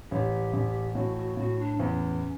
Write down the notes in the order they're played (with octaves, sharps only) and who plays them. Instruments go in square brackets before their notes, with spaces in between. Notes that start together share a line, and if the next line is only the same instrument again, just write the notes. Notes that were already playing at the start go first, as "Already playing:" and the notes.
[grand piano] A1 [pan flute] G4
[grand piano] A1
[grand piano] A2 [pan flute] F#4
[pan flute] F#4
[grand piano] A2 [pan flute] F#4
[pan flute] D4
[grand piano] E2 [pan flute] C#4